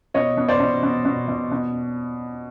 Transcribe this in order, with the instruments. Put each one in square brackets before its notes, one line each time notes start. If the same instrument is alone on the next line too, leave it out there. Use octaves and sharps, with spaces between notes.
[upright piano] B2 C#5 D#5
B2
C5 D5
B2
B2
B2
B2
B2